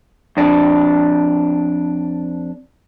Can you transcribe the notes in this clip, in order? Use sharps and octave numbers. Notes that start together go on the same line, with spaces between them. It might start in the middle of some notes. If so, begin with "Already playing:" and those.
F2 D4